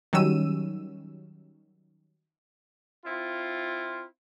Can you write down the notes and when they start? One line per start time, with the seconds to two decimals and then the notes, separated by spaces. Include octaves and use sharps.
0.13 D#3 F#3 G3 C#4 E6 D#7
3.05 C4 E4 F4